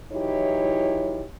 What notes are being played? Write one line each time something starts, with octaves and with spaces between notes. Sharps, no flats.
E3 F#3 D#4 E4 G4 C#5